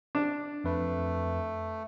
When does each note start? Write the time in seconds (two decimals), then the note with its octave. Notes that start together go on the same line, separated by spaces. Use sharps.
0.15 D4
0.64 F2 A3 B4